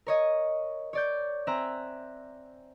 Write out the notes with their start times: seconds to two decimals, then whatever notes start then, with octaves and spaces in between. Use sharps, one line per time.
0.06 A#4 C#5 D#5
0.93 C#5 D5 G6
1.47 C4 E5 G#5 A#5 F#6